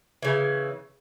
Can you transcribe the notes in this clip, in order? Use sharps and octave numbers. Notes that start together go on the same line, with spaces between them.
C#3 E3